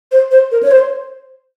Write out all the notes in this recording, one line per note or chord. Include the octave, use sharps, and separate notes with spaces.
C5
C5
A#4
C#5
C5